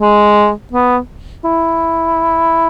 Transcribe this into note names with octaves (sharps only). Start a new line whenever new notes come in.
G#3
B3
E4